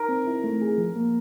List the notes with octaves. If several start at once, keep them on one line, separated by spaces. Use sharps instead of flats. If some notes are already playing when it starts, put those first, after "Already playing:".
Already playing: D#4 A#4
C4
E4
A3
G#4
F3
A#3